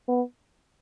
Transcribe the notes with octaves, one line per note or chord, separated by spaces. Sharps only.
B3